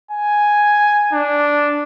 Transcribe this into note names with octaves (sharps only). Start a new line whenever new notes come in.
G#5
D4